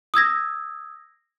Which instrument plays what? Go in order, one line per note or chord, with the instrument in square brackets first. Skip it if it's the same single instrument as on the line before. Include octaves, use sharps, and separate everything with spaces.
[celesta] D#6 E6 G#6 A#6